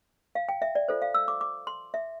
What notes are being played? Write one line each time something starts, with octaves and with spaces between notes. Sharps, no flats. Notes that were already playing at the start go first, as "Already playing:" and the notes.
F5
G5
E5
D5
F4 A4 C5
F5
E6
D6
D6
C6
E5